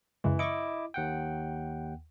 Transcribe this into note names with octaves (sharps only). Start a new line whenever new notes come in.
F#2 C#3 E3 G#3
E4 D#5 C#6 D6 C#7
D#2 F#5 G5